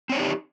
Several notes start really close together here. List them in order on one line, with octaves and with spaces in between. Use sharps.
C4 C#5 D4 D#4 G4